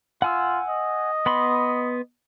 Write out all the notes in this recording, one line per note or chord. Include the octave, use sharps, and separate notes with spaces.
F4 F#5 G#5 E6
D#5
B3 B5 C6